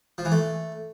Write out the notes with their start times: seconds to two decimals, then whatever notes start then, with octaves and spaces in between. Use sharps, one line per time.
0.18 F3
0.25 E3
0.32 A3